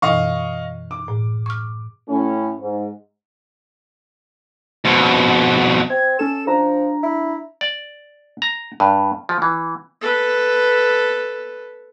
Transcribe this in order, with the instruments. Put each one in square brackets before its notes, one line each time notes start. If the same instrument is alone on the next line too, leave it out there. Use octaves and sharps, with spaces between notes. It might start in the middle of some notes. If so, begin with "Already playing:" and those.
[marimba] F#2 B2 E3 [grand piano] D#5 F5 C#6
[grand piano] D6
[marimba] A2
C#6 F6
[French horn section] A2 A3 C#4
G#2
[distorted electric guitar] F2 B2
[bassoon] C4 [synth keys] G#6
[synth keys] C#4 E7 [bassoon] A4
[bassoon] F3 [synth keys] D4 A#5
[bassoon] E4
[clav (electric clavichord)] D5
A#5
G2
F3
E3
[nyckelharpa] A4 B4